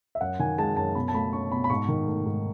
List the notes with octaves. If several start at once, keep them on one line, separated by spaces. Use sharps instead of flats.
E5
F#2 F#5
D#3 G#5
G#3 A5
F#2 A5
B2 B5
A5
A3 B5
C#4 C#6
B2 B5
B5
G#2 C#6
D#3
A3
G#2